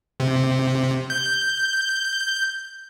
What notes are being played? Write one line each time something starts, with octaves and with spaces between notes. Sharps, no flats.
C3
G6